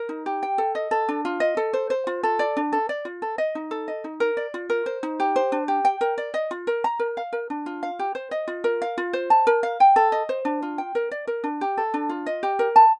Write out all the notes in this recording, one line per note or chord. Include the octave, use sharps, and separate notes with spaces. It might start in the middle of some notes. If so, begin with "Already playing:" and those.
Already playing: A#4
D#4
G4
G5
A4
D#5
A4
D4
F4
D#5
A4
C5
C5
F4
A4
D5
D4
A4
D5
F4
A4
D#5
D#4
A4
D#5
D#4
A#4
D5
F4
A#4
C5
D#4
G4
C5
D4
G4
G5
A#4
D5
D#5
F4
A#4
A#5
A#4
F5
A#4
D4
F4
F5
G4
C5
D#5
F4
A#4
F5
F4
C5
A5
A#4
F5
G5
A4
D#5
C5
D4
F4
G5
A#4
D5
A#4
D4
G4
A4
D4
F4
D#5
G4
A#4
A5